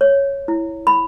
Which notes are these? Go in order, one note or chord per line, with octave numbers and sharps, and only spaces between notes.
C#5
E4
B5